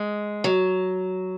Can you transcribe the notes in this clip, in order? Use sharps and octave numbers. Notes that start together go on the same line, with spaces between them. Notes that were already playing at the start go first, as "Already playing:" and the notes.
Already playing: G#3
F#3